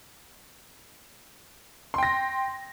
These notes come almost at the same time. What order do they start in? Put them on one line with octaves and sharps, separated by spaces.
C6 G5 A#6